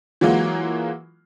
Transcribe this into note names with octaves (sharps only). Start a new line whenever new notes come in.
E3 F#3 G#3 A#3 F4 F#4